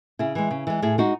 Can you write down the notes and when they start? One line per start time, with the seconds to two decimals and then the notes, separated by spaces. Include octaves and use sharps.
0.19 C#3 E4 G#4
0.35 E3 G#3
0.51 C#3
0.67 E3 G#3
0.82 A2 E4 G#4
0.98 G#3 D#4 F#4